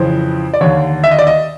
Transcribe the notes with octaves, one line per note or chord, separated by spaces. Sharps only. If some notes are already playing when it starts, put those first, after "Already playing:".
Already playing: F2 C#3 E3 C5
D5
D#2 D3 C#5
E5
D#5
D5
D#5